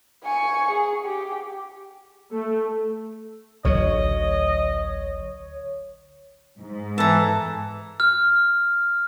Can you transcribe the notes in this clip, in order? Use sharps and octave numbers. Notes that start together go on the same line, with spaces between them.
G#5 C#6
G#4
G4
A3
A1 D2 D3 F#3 C#5 D#5
G#2
E3 A4 A5 A#5
F6